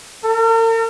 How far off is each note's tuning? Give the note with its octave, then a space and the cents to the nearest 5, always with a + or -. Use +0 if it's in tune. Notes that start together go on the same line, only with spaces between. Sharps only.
A#4 -45